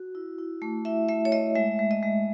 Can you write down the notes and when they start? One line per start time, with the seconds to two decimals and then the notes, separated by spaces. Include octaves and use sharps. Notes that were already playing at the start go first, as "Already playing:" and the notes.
Already playing: F#4
0.15 E4
0.38 E4
0.62 A3
0.85 E4 E5
1.09 A3 E5
1.25 C#5
1.32 A3 D#5
1.55 G#3 E5
1.79 G#3
1.91 D#5
2.03 G#3